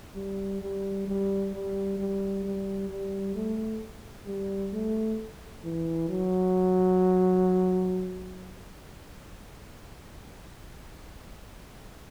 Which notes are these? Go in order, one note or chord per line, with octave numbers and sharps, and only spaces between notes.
G3
G3
G3
G3
G3
G3
G3
A3
G3
A3
E3
F#3